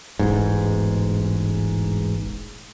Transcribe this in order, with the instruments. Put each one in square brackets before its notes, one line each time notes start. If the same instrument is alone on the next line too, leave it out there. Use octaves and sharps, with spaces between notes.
[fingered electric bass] E1 A1 E2 G#2